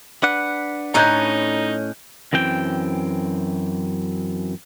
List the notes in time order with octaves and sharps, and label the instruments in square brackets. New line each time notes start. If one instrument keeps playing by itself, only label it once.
[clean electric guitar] D4 B4 F#5
[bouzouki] A2 C#4 D#5 [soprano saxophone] D#4 [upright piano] A#5 F#6 G6
[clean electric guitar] F#2 E3 C4 G5